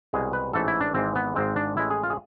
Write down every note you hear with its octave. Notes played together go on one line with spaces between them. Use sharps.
C2 B2 G#3 G#4
B4
A1 G#2 E3 A3 A4
E4
D4
G#1 G#2 E3 G#3 C4
B3
G#1 G#2 G#3 C4
D4
A1 A2 G#3 E4
G#4
F4
G#4